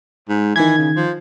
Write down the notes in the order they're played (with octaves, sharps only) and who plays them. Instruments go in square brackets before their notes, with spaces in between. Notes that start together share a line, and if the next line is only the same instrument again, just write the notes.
[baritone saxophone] G#2
[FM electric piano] D#3 G#6 [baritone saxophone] E3
[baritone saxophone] C#3
F3